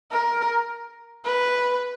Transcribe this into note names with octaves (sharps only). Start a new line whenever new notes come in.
A#4
B4